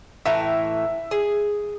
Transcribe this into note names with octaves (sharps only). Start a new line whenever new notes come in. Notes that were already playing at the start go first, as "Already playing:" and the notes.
A2 E3 E5 A#5
G#4